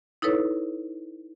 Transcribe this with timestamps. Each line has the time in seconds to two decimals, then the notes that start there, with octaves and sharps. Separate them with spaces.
0.22 D#4 E4 A4 B4 C#5